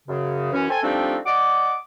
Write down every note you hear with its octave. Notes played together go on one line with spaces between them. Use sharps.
F#2 C#3
F#2 E3 C#4
A4 C5 G5 G#5
F3 G3 A3 C4 D4 D#4
D5 D#5 F#5 D6